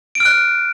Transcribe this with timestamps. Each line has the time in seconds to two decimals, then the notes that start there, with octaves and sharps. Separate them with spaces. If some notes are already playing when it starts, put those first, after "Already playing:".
0.15 D7
0.20 F6
0.25 F#6